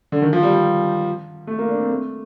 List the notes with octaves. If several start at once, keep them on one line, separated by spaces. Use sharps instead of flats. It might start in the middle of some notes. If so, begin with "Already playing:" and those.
D3
D#3
F3
G3
G3
A3
A#3
D4
C4
A3